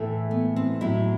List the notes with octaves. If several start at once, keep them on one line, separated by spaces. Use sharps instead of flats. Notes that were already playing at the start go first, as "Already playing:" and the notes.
Already playing: A2 E3 A3
B3
C4
A2 F#3 E4